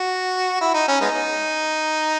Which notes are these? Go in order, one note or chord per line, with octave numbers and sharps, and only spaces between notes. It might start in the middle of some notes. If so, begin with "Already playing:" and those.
Already playing: F#4
E4
D#4
C#4
G#3 B3 D#4